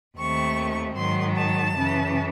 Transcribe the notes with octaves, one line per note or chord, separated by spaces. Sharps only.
D#2 D#3 A3 C4 C#6
G#2 D#3 F#3 C6
A5
F#2 C#3 E3